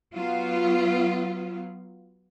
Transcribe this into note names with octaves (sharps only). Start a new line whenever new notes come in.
F#3 B3 F4